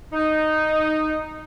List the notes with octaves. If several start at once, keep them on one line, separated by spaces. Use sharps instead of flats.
D#4